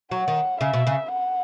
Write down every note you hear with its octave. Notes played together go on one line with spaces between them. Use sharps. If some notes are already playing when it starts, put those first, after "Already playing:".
F#3 F#5
D#3
C#3 E5
B2
C#3
F#5